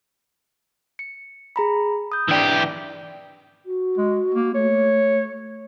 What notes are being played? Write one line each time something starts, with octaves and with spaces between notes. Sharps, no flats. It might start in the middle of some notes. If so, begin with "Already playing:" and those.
C#7
G#4 A#5 B5
D#6 G6
E3 D4 G4 D5
F#4
G#3
A#3
A3 C#5